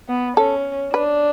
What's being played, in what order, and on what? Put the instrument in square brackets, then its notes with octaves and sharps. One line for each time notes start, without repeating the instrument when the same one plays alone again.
[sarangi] B3
[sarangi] C#4 [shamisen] A4
[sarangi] D4 [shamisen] B4